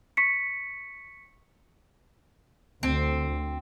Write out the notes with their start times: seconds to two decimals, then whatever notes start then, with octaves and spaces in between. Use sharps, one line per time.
0.17 C#6 B6 C#7
2.83 D2 D3 C4